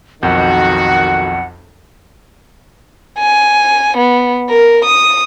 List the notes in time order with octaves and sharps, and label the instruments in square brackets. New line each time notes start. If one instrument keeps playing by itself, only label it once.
[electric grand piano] B1 F2 G6 [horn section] D#3 F#4 [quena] F#5
[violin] G#5
B3
A#4
D#6